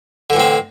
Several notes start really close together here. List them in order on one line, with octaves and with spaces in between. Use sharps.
D3 E3 A2 C4